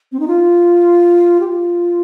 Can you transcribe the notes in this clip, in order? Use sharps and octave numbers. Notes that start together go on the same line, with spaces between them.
C4
D#4
F4
G4
F4